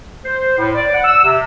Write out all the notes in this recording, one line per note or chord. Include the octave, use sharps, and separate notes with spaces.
C5
A2
D5
F#5
E6
C3